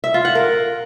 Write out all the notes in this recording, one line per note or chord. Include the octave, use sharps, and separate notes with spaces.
E5
F4
F#5
A#4